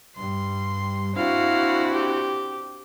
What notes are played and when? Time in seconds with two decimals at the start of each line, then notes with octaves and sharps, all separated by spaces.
0.17 G2 G3 C6
1.16 C4 D4 E4 F#4 F5
1.93 G4